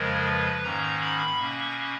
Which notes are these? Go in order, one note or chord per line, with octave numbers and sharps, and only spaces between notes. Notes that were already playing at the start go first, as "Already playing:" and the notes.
Already playing: F2 C#3 F3 G#3 A#4
B4
G#2 D#3 A#3 C#4 A#5
B5
B2 A#3 C#4 C#6